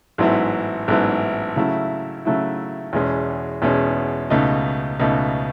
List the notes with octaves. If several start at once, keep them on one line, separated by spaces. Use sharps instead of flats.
A1 G#2 F#3 B3 E4
A1 G#2 F#3 B3 E4
C#3 F#3 A3 E4
C#3 F#3 A3 E4
E2 B2 G#3 C#4
E2 B2 G#3 C#4
C#2 B2 A3 D#4
C#2 B2 A3 D#4